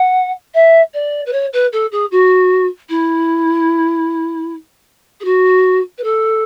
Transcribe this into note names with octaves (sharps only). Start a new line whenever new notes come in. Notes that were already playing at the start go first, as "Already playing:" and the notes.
Already playing: F#5
E5
D5
B4
C#5
B4
A4
G#4
F#4
E4
G#4
F#4
B4
A4